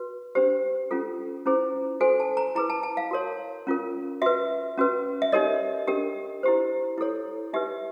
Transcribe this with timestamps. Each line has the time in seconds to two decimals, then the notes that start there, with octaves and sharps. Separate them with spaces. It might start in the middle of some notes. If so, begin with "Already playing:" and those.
Already playing: F#4 B4
0.35 D4 G4 C5
0.91 C#4 F4 A4
1.46 C#4 E4 G#4 C5
2.01 F#4 A4 C5 G#5
2.20 A5
2.37 A#5
2.55 E4 G#4 B4 A#5
2.70 A5
2.83 A5
2.97 F5
3.11 F#4 A#4 C#5
3.67 C#4 F4 A#4
4.22 F#4 B4 E5
4.78 C#4 F#4 B4
5.22 E5
5.32 D#4 G4 A#4 C#5 D#5
5.87 D4 G4 A#4
6.43 E4 G4 C5
6.98 E4 A4 C#5
7.53 D#4 G4 B4 E5